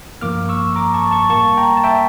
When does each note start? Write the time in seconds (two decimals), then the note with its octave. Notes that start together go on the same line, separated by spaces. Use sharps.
0.21 G2 F3 A#3 D6 F6
0.49 C#6 E6
0.76 A#5 D6
0.94 A5 C#6
1.11 A5 C#6
1.30 A2 G3 A#3 A5 C#6
1.57 G5 A#5
1.77 A5
1.84 E5 G5